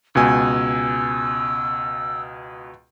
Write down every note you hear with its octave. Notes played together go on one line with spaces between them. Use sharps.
C#2 B2 G#5 E6